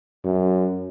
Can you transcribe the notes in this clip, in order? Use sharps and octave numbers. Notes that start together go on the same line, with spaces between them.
F#2